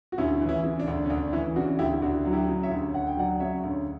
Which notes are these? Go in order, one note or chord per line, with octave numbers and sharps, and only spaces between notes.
F#4
D2 C#4 E4
E3
C#4 E4
C#3
D4
D2
C#4
D2 D4
E3 C#4 E4
C#3 D4 F#4
D2 E4 G4
D2 D4 F#4
F#3
E4 G4
C#3
C#5 E5
D2
D2 F#5
G5
F#3 D5 F#5
C#3 C#5 E5
D2